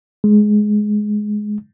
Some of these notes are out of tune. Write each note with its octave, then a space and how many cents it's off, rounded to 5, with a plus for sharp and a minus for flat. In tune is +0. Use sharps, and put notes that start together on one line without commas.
G#3 +10